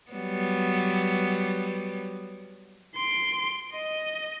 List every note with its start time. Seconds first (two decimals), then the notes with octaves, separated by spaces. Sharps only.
0.12 F#3 G3 B3
2.95 C6 D7
3.73 D#5